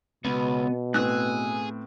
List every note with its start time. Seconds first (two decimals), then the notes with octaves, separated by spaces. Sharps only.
0.25 C#2 B2 B3
0.94 A2 B3 C4 G#4 G#5 E6 F#6